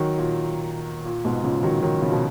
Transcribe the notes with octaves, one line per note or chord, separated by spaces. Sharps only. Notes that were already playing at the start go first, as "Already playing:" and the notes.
Already playing: D#3 F#3
A#2
A#2
G#2 B2
A#2 C#3
D#3 F#3
D#3 F#3
C#3 F3
B2